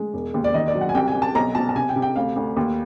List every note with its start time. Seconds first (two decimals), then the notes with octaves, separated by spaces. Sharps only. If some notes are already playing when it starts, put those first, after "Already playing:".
Already playing: G#3
0.14 E1
0.34 D#2
0.44 D5
0.54 D#3 D#5
0.68 D5
0.75 F#3
0.81 F#5
0.89 G#5
0.94 C2 G5
1.08 G#5
1.14 C2
1.22 A5
1.35 B1 A#5
1.55 B2 A5
1.69 A5
1.76 C3 G#5
1.89 G5
1.96 C3
2.02 G5
2.16 D2 F5
2.36 D2
2.57 D#2